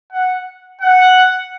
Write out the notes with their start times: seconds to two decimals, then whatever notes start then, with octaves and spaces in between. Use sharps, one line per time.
0.12 F#5
0.81 F#5